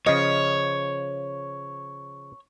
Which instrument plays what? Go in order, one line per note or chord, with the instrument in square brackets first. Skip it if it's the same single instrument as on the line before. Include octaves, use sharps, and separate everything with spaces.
[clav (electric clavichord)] C#3 F3 [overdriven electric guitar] C#5 [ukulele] D#5